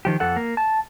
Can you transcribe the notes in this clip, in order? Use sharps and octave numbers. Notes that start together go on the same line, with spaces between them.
D#3 F3 G4
F2 A4 F#5
A#3
A5